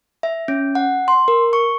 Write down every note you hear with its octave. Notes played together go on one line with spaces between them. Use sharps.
E5
C#4
F#5
C6
A#4
C#6